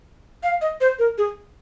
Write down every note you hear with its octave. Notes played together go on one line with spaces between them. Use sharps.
F5
D#5
C5
A#4
G#4